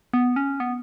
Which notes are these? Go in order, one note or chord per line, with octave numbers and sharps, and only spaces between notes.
B3
C#4
B3